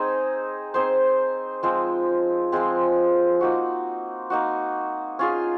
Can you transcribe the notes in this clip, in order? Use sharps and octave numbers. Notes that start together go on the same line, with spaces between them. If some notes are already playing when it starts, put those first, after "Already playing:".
Already playing: C4 D#4 G#4 C5
C4 D#4 G#4 C5
F3 G#3 C4
F3 G#3 C4
A#3 D#4 F#4
A#3 D#4 F#4
C#4 F4 G#4